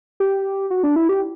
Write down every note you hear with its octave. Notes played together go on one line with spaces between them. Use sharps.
G4
F#4
D4
E4
G4